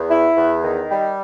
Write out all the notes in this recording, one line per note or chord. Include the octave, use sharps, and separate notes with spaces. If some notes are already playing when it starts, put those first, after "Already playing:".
Already playing: E2
E4
E2
D#3
G3